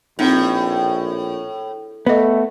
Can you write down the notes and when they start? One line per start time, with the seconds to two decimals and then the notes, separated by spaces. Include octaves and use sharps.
0.19 A#1 A2 C4 D#4 F4
2.07 A3 B3 A4 B4 D#5